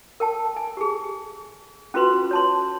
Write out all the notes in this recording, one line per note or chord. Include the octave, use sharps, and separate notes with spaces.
A#4 G5 A5
G#5
G4 G#4
C#4 F4 F#4 B4 C6
C#5 A5 C6